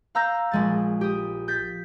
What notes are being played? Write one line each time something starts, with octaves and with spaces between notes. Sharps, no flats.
F5 A#5 E6 G6 A#6
A#1 G#3 A6
G4 D#6
G6 A6 B6